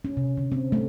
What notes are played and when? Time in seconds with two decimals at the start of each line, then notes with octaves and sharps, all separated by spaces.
0.05 C#4
0.17 C3
0.37 D3
0.52 C4
0.72 A3